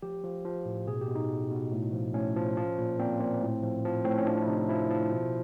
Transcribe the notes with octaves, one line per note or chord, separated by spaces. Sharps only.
F3 G4
F3
F3
A2
B2 G#4
G4
B2
D#4
B2
B2
A2
F3
A2 C#4
F3
F3
A#2
A#2 C4
A#2
A2
F3
F3
A2 C4
C#4
F3 D4
E4
C3 D#4
F3 E4
F3
B2